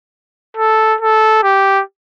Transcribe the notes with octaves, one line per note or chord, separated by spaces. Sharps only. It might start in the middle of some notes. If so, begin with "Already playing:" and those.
A4
A4
G4